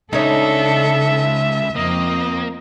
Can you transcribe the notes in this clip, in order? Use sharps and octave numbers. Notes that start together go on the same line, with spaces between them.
C#2 C#3 D4 D#4 A4 C#5 E5
F2 A#3 C4 D#5